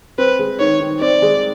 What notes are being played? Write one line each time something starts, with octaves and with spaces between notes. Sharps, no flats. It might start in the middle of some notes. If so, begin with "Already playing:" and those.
C4 B4
G#3
D#3 C#5
D#3
C4 D5
G#3